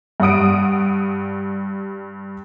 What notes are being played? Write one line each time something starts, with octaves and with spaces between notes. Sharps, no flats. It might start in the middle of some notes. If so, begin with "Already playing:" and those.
G2 G3 F#5 D#6 D7